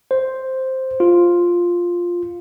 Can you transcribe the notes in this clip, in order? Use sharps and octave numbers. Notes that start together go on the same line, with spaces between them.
C5
F4